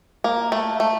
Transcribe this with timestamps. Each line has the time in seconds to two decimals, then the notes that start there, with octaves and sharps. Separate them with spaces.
0.24 A#3
0.52 A3
0.80 A3